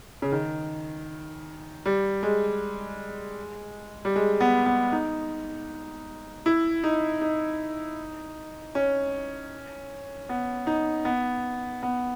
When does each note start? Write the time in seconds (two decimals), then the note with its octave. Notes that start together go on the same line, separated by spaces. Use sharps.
0.22 C#3
0.32 D#3
1.86 G3
2.23 G#3
4.05 G3
4.16 G#3
4.41 B3
4.66 B3
4.92 D#4
6.46 E4
6.84 D#4
7.21 D#4
8.75 C#4
10.29 B3
10.67 D#4
11.05 B3
11.83 B3